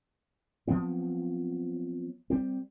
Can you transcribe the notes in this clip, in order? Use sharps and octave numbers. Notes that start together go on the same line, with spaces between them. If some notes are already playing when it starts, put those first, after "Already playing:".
F3 F#3 B3 C4
G3 C4